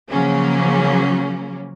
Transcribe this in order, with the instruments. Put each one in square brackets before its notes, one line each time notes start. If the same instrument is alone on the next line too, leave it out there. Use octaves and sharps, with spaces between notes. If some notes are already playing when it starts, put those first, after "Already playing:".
[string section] C#3 F3 F#3 A#3 C#4